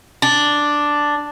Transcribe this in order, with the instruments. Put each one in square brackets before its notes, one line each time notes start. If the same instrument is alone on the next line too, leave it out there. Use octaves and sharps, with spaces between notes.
[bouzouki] D4